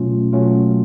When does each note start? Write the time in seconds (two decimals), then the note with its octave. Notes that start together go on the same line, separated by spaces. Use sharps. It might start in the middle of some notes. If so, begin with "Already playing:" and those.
Already playing: B2 F#3 A3 C#4 F4
0.33 B2 F#3 A3 C#4 F4